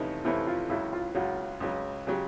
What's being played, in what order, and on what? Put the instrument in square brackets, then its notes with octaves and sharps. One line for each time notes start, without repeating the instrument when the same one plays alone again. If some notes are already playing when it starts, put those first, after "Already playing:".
Already playing: [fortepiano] F2 C3 E3 A3 C#4 [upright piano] D#4
[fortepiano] F2 C3 E3 A3 C#4 [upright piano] E4
[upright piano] F4
[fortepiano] C#2 C#3 F#3 [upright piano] E4
[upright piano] F4
[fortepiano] C#2 C#3 F#3 [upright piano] F#4
[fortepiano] C#2 C#3 F#3
[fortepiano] C#3 F#3 [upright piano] G4